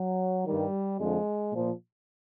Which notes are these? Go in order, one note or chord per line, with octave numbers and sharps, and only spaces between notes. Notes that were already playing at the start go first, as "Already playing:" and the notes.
Already playing: F#3
G2 D#3 G3
F2 D3 F3 G#3
A#2 F3